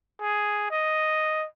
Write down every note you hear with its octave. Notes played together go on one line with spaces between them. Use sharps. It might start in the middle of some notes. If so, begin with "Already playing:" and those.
G#4
D#5